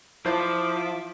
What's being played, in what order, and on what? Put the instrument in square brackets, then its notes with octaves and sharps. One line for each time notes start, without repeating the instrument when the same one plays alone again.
[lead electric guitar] F3 [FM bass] E4 [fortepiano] C5 F5 A5 [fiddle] E5 D6